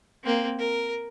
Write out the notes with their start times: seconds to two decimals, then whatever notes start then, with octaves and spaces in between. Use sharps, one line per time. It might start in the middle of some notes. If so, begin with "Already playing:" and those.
0.24 A#3 C4
0.59 A#4